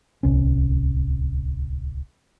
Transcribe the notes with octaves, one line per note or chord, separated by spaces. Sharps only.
D1 C2 C#4